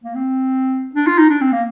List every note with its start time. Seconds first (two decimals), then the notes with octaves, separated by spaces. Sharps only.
0.04 A#3
0.15 C4
0.95 D4
1.07 F4
1.18 D#4
1.30 D4
1.41 C4
1.52 A#3